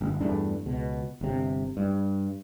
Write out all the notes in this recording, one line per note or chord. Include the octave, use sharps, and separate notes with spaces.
G1
E2 G2 A3 D4
C#2 B2
G1 C3
G2